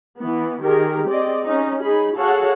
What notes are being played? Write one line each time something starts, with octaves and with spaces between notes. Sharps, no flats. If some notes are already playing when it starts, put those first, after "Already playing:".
E3 B3
D#3 G4 G#4 A#4
C4 G#4 D5 D#5
C#4 D#4
D#4 G#4 B5
F#4 G#4 A4 C#5 F5 F#5